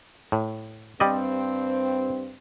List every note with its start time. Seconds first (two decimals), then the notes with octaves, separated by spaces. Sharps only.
0.32 A2
1.00 G2 G3 C4 D5 D#5